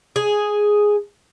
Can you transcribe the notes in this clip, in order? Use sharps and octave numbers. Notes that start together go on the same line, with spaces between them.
G#4